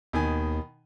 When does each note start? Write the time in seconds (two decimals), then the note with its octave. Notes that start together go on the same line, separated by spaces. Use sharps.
0.13 D#2 B2 D#3 G#5